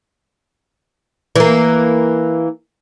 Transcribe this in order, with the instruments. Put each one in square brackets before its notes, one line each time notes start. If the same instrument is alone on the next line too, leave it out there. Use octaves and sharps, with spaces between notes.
[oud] E3 A#3